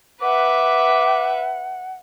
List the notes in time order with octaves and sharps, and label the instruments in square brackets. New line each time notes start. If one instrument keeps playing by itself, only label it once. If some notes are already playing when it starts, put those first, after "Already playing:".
[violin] B4 E5 [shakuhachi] F#5 [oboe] D6